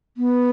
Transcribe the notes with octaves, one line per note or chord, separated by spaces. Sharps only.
B3